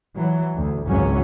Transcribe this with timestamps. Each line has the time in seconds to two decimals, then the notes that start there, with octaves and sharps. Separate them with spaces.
0.15 E3 F#3
0.56 D2
0.88 G#1 C#2 F#2 E3 F#3 C#4